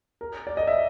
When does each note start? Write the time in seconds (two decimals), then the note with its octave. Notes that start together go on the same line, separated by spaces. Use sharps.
0.21 A#4
0.47 D5
0.57 D#5
0.67 E5